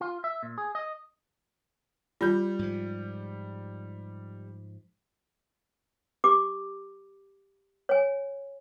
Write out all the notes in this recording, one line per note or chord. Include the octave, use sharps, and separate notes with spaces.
F4
E5
A#2
G#4
D#5
G3 F4 G6
G#2 F3
G4 D6
C#5 G#5